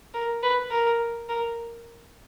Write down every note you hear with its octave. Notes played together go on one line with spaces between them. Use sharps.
A#4
B4
A#4
A#4